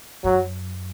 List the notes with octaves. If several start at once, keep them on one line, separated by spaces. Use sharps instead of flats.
F#2 F#3